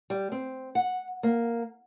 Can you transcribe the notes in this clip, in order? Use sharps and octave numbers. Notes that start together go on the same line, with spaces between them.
G3
C4
F#5
A#3